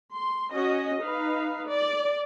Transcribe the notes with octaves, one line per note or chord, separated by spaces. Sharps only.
C6
C#4 F#4 D#5
D#4 B4 F5
D5